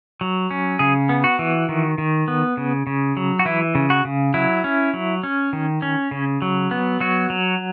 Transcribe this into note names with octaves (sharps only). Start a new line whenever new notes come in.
F#3
C#4
C#3 G#4
B3
F#4
E3
D#3
D#3
B3
C#3
C#3
F#3
F#4
E3 E4
C#3
F#4
C#3
F#3 E4
C#4
F#3
C#4
D#3
C#4
C#3
F#3
B3
F#3 F#4
F#3